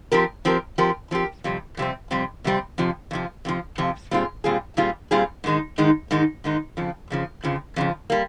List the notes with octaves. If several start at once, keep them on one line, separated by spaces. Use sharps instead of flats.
F3 C4 G4 A#4
F3 C4 G4 A#4
F3 C4 G4 A#4
F3 C4 G4 A#4
F2 C3 G3 C4
F2 C3 G3 C4
F2 C3 G3 C4
F2 C3 G3 C4
F2 C3 F3
F2 C3 F3
F2 C3 F3
F2 C3 F3
A#2 G3 C4 F4 G#4
A#2 G3 C4 F4 G#4
A#2 G3 C4 F4 G#4
A#2 G3 C4 F4 G#4
G#2 D#3 G#3 D#4
G#2 D#3 G#3 D#4
G#2 D#3 G#3 D#4
G#2 D#3 G#3 D#4
F2 C#3 F3
F2 C#3 F3
F2 C#3 F3
F2 C#3 F3
G3 A#3